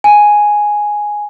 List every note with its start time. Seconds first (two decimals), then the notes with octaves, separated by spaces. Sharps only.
0.04 G#5